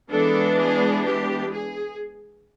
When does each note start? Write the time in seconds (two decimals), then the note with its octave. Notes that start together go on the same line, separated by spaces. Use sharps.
0.11 E3 G#3 B3 D4 A4
0.58 G#4
1.05 G4
1.52 G#4